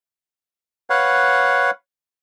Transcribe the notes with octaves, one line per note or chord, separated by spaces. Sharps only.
B4 C#5 F5 F#5